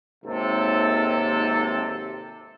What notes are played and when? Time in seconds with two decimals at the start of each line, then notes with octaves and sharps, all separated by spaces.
0.24 G#1 D#2 C3 A4